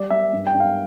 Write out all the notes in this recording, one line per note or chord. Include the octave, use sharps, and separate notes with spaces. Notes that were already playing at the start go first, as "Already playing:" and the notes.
Already playing: G3 D5
G3 E5
G2
G5
G2
F5